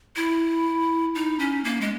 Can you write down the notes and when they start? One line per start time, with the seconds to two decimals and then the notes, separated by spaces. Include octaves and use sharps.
0.16 E4
1.15 D#4
1.39 C#4
1.64 A#3
1.81 G#3